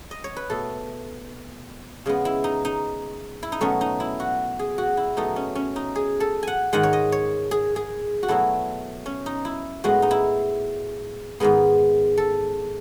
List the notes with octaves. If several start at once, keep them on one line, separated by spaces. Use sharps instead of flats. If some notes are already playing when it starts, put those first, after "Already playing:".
D#5
C#5
B4
B2 A3 A4
C#3 G#3 B3
E4
D#4
D#4
E4
D#4
B2 F#3 A3 C#4
D#4
E4
F#4
G#4
F#4
E4
B2 F#3 A3 D#4
C#4
C#4
D#4
G#4
A4
F#5 G#5
G#2 D#3 G#3 F#5
C#5
D#5
C#5
G#4
G#4
F#4
B2 F#3 A3 E4
C#4
D#4
E4
A2 G#3 B3 F#4
D#4
E4
G#2 D#3 G#3 B3
A4